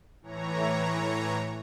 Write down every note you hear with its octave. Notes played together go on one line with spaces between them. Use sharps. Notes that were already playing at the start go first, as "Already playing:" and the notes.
A2 E3 C#5 A#5